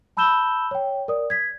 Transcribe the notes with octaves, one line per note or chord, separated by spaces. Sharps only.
A5 B5 E6 G6 E7 G7
C#5 G5
A#4 D5 D#6
G#6 B6